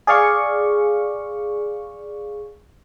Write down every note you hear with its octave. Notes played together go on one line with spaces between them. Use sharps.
G#4 D5 F5 C#6